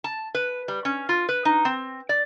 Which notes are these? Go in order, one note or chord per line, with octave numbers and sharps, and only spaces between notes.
A5
B4
G3
C#4
F4
B4
D#4
C4
D5